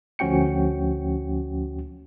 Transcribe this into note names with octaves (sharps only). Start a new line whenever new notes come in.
D2 F3 C#4 F#4 G5 C#7